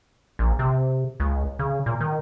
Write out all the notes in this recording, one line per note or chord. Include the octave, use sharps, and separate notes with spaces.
A#1
C3
C#2
C#3
A#2
D#3